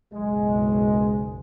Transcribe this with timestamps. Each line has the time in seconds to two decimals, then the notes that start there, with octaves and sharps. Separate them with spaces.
0.12 F#1 B1 G#3